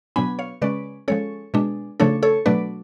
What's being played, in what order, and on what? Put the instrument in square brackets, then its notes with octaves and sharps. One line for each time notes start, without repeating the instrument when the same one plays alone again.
[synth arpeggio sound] B2 F#3 B3 D4 G#5 B5
C#5 F5
C#3 G#3 C#4 B4 D5
F3 G#3 C#4 A4 C#5
B2 G#3 D4
C#3 F3 A3 D4 A4 C#5
A4 C#5
B2 F#3 A3 D4 B4 D5